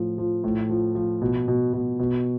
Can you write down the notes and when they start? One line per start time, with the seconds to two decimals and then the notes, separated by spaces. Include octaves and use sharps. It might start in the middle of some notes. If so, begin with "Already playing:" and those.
Already playing: A2 F3
0.18 F3
0.44 A2
0.69 F3
0.95 F3
1.22 B2
1.48 B2
1.73 B2
1.99 B2